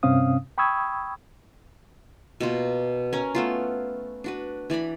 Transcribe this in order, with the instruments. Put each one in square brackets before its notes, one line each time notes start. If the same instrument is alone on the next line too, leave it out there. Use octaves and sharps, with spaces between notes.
[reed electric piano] G2 C3 C4 C#4 F5 D#6
G5 B5 C#6 D#6 E6 G#6
[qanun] B2 A#3 F4
C#4 A#4
A3 B3 F4
D4 F#4 B4
E3 D5 A#5 B5